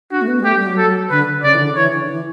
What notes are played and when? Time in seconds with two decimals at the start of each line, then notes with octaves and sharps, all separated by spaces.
0.11 D4 F#4
0.22 A3
0.28 B3
0.40 G3
0.44 A3 G4
0.55 G3
0.66 F#3
0.77 A4
1.10 D3 B4
1.42 C#3 D5
1.55 E3
1.59 D3
1.75 E3 C#5
1.92 D3
2.04 D3
2.09 E3